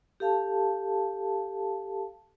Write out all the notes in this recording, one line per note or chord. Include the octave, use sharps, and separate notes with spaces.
G4 A4 F5 A5